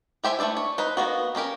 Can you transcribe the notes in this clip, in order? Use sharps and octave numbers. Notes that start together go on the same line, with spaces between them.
E4 G4 C5 E5 G#5
A3 E4 F4 D5 E5
C#5
D#4 B4 C5
A#3 B3 F#4
A#3 C#4 G4 A#4